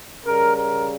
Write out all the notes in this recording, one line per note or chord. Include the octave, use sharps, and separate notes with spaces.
C#3 G3 A#4
A#4